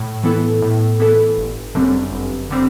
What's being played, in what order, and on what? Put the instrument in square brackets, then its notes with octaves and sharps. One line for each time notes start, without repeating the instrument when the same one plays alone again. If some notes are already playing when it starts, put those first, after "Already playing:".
Already playing: [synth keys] A2
E3 B3 E4 A4
A2
E3 B3 E4 A4
G1
F#2 D3 G3 C4
G1
D3 G3 C4